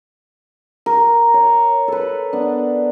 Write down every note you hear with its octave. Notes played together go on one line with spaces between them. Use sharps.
A#4
C#5
A4 B4
B3 D4